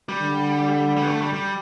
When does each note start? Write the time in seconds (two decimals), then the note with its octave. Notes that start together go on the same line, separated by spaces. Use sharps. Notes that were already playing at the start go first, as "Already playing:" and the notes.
0.09 G3
0.21 D3
0.96 G3
1.03 B3
1.09 A3
1.22 G3
1.34 G3